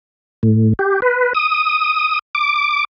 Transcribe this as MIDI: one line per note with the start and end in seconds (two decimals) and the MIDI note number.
0.43 0.73 45
0.79 1.00 67
1.02 1.33 71
1.35 2.19 87
2.35 2.85 86